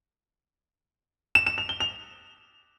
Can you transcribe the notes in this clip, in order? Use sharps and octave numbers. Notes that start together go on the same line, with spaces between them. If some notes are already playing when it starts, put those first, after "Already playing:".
E7
E7
F7
G7
F7